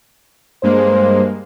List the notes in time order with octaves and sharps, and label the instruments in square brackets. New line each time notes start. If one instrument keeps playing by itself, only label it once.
[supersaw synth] G2 G#3 A#3 [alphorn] C5